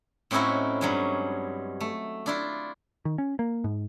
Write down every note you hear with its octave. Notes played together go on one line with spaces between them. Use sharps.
A2 C4 C#4 D#4 E4 F#4
G2 F#3 G#3
A3
D4 E4 F4
D#3
C#4
A#3
G#2